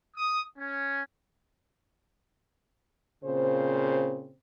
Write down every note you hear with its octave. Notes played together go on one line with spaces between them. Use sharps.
D#6
C#4
A#2 C#3 C4 C5